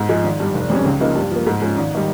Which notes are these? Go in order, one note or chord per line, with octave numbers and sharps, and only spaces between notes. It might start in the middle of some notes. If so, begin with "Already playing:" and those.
Already playing: G#2
F3 G#3
G#1
G2 G3
F1
F2 C3 G3 C#4
C#2
C#3 F3 A#3 D#4
G2
F3 A#3
G#2
F3 G#3 C#4
G#1
D#3 G3